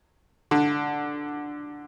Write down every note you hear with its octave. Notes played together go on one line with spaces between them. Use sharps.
D3